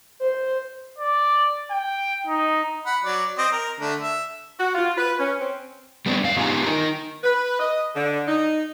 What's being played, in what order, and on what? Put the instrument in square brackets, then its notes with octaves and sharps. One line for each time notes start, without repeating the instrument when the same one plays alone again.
[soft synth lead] C5
[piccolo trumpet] D5
G5
D#4
[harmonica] F#5 B5
F#3 D5
C4 D#5
A#4
D3 A3 D4
E5
[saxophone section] F#4
F4
B4
C#4
C4
[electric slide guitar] G3 B3 C4 D4 G4
F#2 F5
B3 D#4 F4 G4 G#5 A#5
D#4 A#4
[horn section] B4
D#5
D3
D#4